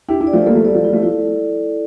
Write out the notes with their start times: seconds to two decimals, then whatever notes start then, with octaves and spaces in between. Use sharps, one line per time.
0.09 D4 E4 G4
0.21 E4 G4
0.27 D5
0.33 F3 A3
0.46 G3 A#3 A4
0.55 F3 A3
0.65 G3 D5
0.75 F3
0.84 G3 E4
0.93 F3 A3
1.03 F3 E4